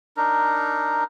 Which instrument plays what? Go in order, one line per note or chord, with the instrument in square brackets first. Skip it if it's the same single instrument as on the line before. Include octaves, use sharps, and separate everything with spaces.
[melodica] D4 D#4 A#4